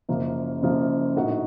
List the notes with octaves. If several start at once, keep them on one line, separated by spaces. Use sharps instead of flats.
F#1 F#2 C#3 F3 A#3
F#1 F#2 C#3 F3 A#3
A#1 A2 A3 D#4 F#4